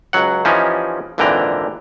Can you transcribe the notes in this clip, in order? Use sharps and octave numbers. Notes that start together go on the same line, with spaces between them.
C#2 F#3 F#5
E3 F3 C#4 D#4 G4
G#1 A#2 D3 E3 G5 A#5